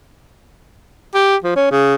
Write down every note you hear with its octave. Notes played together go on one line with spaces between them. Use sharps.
G4
F3
C#4
C#3